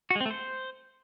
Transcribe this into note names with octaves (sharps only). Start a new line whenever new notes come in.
F#4
G#3
C4
A3
C5